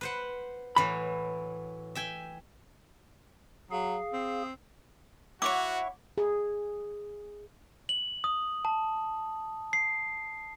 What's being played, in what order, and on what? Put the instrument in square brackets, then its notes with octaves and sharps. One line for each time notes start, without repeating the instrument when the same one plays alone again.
[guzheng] B4 C5 F#5
[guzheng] A2 E3 F#3 [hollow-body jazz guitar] B5
[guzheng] E5 G5 G#5
[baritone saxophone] F#3 [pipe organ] G#4 F5
[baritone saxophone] C4
[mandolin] E4 C#5 C#6 [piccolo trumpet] F#4 [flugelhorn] F#5 [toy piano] D6
[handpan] G#4
[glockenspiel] F#7
D#6
A5
C7